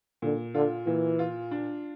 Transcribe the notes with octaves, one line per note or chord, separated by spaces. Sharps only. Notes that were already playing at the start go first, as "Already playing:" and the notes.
A#2 D3
D3 F4
A#2 E3
F4
D4